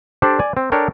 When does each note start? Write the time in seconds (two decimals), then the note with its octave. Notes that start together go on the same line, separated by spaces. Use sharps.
0.22 D4 G4 A4 C5 D5
0.39 D5 G#5
0.57 C4
0.72 D4 A4 A#4 C#5 G5